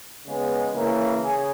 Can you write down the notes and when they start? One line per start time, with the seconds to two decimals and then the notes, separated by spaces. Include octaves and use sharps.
0.25 C#3 G#3 B3
0.74 C#3 E3 A#3
1.23 C#3 G#4